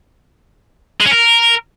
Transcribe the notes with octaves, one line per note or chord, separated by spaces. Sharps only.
G#3
C#4
A#4